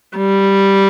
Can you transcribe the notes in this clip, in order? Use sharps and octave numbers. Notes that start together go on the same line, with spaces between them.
G3